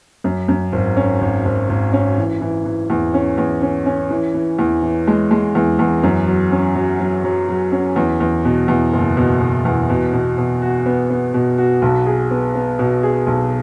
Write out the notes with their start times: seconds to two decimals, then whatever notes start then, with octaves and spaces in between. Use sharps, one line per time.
0.24 F#2
0.48 F#2
0.72 G#1
0.97 C#4
1.21 G#1
1.45 G#1
1.69 G#1
1.93 C#4
2.18 E3
2.41 E3
2.65 E3
2.90 E2
3.14 C#4
3.38 E2
3.62 C#4
3.86 C#4
4.10 E3
4.34 E3
4.59 E2
4.83 E3
5.07 G#3
5.31 G#3
5.55 E2
5.79 E2
6.03 F#2
6.27 F#3
6.52 C#4
6.75 F#3
7.00 F#3
7.24 F#3
7.49 F#3
7.72 C#4
7.96 E2
8.20 E2
8.45 B2
8.68 E2
8.93 F#1
9.17 B2
9.41 B2
9.65 E2
9.90 B2
10.13 B2
10.38 B2
10.62 F#4
10.86 B3
11.10 B3
11.34 B2
11.58 F#4
11.82 B1
12.06 G#4
12.31 B3
12.55 B3
12.79 B2
13.03 G#4
13.27 B1